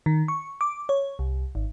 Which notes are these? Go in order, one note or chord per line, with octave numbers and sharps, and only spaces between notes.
D#3
C#6
D6
C#5
C2
G#1